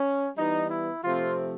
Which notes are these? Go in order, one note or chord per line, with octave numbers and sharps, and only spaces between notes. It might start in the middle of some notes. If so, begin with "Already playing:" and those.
Already playing: C#4
E3 G3 B3 D#4
E4
C3 F3 A3 C4 F4